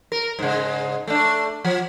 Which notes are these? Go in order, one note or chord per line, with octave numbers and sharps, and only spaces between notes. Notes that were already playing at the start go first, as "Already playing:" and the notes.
A#4
G#2 C#3
A3 D4
F3